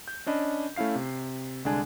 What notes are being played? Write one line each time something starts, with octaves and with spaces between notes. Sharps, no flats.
G6
C#4 D4 D#5 B5
A3 C#4 E4 F5 C7
C3
C2 D3 G#3 D4 G#5